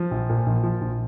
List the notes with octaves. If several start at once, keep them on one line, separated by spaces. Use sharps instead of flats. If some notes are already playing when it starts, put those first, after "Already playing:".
Already playing: F3
A#1
A#2
A#1
F3
A#1